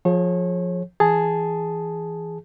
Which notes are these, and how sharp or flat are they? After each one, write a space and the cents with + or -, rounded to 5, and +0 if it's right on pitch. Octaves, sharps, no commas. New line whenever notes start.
F3 +20 G#4 +25 C#5 -30
E3 +5 G#4 +0 A5 +0